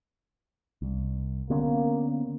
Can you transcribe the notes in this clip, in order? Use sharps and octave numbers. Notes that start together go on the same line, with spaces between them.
C2
D3 A#3 B3 C#4